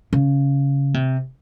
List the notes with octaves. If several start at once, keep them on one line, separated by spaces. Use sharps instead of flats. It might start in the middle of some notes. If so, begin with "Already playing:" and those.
C#3
C3